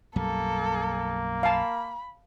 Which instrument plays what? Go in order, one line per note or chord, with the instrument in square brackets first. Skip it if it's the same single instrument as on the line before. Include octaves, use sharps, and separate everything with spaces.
[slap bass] B1 F#2 G3 [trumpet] A#3 [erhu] A4
[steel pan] F5 A5 [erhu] B5